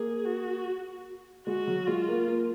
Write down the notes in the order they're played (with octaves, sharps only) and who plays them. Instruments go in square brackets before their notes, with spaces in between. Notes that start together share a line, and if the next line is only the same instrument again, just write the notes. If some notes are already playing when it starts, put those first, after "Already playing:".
Already playing: [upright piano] A#3 [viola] G#4
[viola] F#4
[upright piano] G#3 [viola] F#4
[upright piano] F#3
[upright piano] G#3 [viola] F4
[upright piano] A#3
A#3